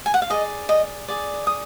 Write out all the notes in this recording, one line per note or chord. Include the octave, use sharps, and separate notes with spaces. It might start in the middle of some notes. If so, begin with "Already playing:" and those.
G#5
F#5
F5
G#4 D5 D#5
D#5
G#4 D5
D#6